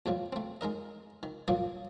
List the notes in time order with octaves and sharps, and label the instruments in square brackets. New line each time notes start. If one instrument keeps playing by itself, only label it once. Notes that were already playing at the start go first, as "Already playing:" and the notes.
[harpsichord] E2 A2 F3 G3
A3 C4
G#3 D#4 A#4 D#5
D#3
G2 A#2 F3 F#3 A#3 D#6